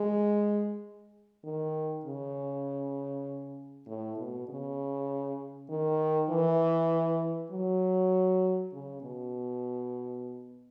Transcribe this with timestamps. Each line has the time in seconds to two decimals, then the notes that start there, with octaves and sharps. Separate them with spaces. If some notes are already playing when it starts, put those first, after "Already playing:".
Already playing: G#3
1.45 D#3
2.05 C#3
3.87 A2
4.18 B2
4.49 C#3
5.69 D#3
6.30 E3
7.52 F#3
8.73 C#3
9.03 B2